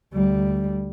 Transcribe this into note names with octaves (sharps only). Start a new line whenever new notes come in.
D2 G3